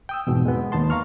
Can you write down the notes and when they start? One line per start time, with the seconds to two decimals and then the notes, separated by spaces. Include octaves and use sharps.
0.09 G5 D#6 E6
0.27 E2 G#2 B2
0.46 G#3 B3
0.72 D#2 D#4 A5 C6
0.90 F5 A#5 C#6 F6